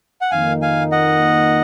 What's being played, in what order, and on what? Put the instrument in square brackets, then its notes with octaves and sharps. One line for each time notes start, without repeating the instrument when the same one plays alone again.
[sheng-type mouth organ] F#5
[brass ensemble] F2 D#3 A#3 D#4 [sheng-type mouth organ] F5 G#5
[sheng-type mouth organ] F5 G#5
D#5 F#5